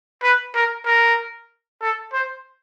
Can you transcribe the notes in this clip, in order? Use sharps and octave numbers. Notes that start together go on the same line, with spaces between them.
B4
A#4
A#4
A4
C5